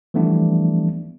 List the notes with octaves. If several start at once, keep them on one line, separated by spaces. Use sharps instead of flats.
E3 F3 G3 A3 B3 D4